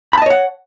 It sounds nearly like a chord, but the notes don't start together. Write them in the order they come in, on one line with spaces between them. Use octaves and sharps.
B5 A5 D#5 C#5 F#5